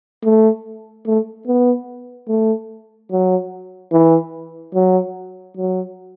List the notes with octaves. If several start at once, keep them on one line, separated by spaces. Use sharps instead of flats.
A3
A3
B3
A3
F#3
E3
F#3
F#3